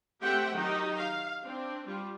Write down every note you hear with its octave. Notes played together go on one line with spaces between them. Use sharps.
A3 C4 G4 E5 F#5 G5
D#3 F#3 D#4 G4
F5
C4 D4
G3 F4